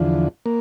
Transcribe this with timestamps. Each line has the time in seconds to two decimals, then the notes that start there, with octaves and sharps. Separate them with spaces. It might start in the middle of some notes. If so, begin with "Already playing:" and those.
Already playing: E2 D3 F3
0.46 A#3